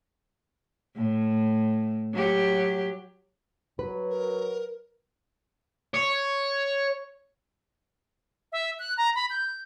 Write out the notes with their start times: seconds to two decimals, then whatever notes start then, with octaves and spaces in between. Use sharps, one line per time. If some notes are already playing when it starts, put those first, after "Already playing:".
0.96 A2
2.14 F#3 G4
3.79 F#3 B4
4.10 A#4
5.94 C#5
8.52 E5
8.79 F#6
8.98 A#5
9.15 B5
9.30 G6